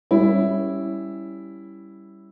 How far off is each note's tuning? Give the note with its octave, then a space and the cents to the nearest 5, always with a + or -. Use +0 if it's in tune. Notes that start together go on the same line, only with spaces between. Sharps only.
G3 +0 C#4 +0 E4 +0